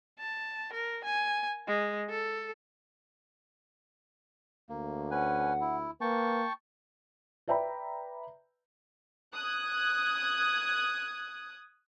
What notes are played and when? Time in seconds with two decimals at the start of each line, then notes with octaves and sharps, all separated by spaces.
0.19 A5
0.73 A#4
1.04 G#5
1.67 G#3
2.10 A4
4.69 D2 A#3
5.11 C#4 B4 F#5 G#5
5.61 E4
6.01 A#3 B4 G5 A5 C#6
7.48 B4 D5 E5 G5 A#5 B5
9.35 D#6 F#6 G#6